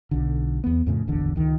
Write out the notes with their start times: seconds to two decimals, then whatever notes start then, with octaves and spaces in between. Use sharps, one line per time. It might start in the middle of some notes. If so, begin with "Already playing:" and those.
0.11 B1 D3
0.64 E2 B3
0.87 F2 A2 C#3
1.07 D1 G#1 E2 D3
1.36 C#2 D#3